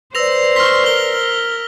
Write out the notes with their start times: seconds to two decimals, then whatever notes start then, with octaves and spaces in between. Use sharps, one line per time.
0.15 B4 C5 D5 E6 A#6 F7
0.56 C6 C#6 F6 B6
0.86 A#4 G7